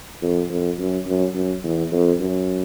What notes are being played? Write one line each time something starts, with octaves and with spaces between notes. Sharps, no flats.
F2
F2
F#2
F#2
F#2
E2
F2
F#2